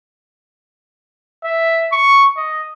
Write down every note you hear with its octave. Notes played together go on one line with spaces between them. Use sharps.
E5
C#6
D#5